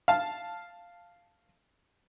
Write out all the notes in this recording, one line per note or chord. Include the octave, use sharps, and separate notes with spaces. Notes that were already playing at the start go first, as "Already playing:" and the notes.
F5 A5